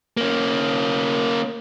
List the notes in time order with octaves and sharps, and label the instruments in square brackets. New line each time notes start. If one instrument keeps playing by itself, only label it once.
[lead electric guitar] A#3 C#4